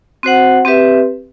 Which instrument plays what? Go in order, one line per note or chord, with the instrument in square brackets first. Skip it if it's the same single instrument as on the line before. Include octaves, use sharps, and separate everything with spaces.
[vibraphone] C4 F#4 C5 F#5
C4 G4 B4 E5